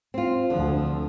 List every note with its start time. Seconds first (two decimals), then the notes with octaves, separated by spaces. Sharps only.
0.14 C4 F4
0.50 D2 D3 F3